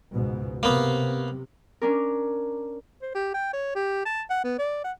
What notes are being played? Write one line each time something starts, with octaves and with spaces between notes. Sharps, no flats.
C#2 G#2 B2
C3 A#3 B3
C#4 D4 A#4
C5
G4
G5
C#5
G4
A5
F#5
B3
D5
F#5